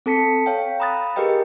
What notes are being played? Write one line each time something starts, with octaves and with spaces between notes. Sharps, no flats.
C4 A4 A5 B6 C#7
C#5 F5 G5
A#5 B5 D#6 F#6 A6
G4 G#4 A#4 B4 D#5 G5